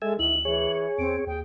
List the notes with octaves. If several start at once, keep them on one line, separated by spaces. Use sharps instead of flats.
G#3 A4 E5 G#5
D2 D#3 E4 F#7
E3 G#4 C#5
E2 C4 D7
D#2 G#4 G5